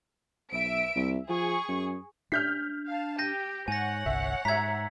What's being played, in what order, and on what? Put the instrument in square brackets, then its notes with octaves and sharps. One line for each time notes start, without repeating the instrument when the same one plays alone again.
[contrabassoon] B1 [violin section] E5 D7
[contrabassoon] C2
[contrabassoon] F3 [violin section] G#4 C#6
[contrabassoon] F#2
[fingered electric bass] D4 [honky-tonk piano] F6 G6 B6
[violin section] F5 A5
[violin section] G4 [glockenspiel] G6 A#6 [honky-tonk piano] D#7
[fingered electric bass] G#2 [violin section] C#5 F#5 [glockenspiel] G#5 A#6
[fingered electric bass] G1 C2 [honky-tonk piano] E5
[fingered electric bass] G#2 [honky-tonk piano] E5 A#5 [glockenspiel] G#6 B6